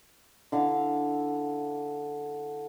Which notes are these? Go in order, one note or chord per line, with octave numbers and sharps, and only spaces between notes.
D3 E4 F5 A#5